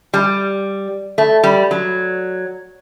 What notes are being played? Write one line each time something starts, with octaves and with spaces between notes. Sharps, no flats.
G3
A3
G3
F#3